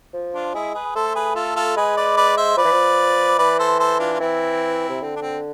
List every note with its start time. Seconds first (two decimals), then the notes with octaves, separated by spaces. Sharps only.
0.13 F3
0.34 D4 F4
0.54 G#3 E4 G#4
0.74 G#4 B4
0.95 A3 A4 C5
1.15 G#4 B4
1.35 F4 A4
1.56 F4 A4
1.76 G#3 G#4 B4
1.97 B4 D5
2.17 B4 D5
2.37 C5 E5
2.57 F3 B4 D5
2.65 E3
2.72 F3
3.38 E3 B4 D5
3.59 A4 C5
3.79 A4 C5
3.99 D4 F4
4.13 F4
4.20 E3 C4 E4
4.89 C3
5.01 D3 C4
5.16 D4
5.22 C4